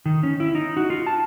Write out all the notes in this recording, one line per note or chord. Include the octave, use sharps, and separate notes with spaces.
D#3
C#4
E4
D#4
F#4
F4
A5